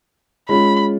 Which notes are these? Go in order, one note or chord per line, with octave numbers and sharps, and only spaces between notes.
G#3 C#4 F4 B5